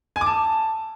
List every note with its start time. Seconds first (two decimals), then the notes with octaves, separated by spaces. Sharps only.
0.16 G#5
0.21 D6
0.26 A5